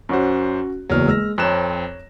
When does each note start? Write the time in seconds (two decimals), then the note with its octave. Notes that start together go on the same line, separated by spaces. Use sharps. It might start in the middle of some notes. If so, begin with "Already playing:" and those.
0.09 F#2 C#4 F#4 C5
0.89 F#1 E2 F#3 F6
1.08 G#3 E6 F6 A#6
1.38 F2 C4 C#5 A#5 F#6 E7